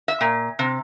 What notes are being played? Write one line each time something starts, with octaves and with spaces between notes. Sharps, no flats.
E5
A#2
C3